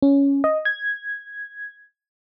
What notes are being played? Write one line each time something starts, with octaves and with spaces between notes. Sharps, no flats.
C#4
D#5
G#6